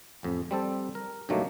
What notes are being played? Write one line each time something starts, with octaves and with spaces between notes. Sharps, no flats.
A1 F2
G3 C4 A4
A#4
G2 B2 D#3 F#3 A3 A#3